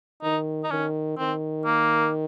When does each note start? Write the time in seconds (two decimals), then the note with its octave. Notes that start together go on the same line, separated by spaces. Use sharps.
0.23 D#3 D#4
0.64 D#4
0.71 D#3 C#4
1.17 D#3 C4
1.65 A#3